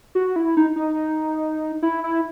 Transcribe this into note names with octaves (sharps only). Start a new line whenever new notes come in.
F#4
E4
D#4
D#4
E4
E4